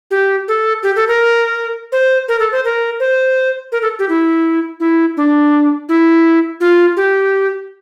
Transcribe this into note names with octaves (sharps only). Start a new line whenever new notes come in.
G4
A4
G4
A4
A#4
C5
A#4
A4
C5
A#4
C5
A#4
A4
G4
E4
E4
D4
E4
F4
G4